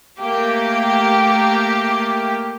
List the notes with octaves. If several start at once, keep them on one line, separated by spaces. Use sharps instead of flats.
A3 A#3 G4